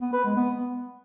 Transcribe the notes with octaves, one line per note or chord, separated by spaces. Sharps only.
B3
B4
G#3
B3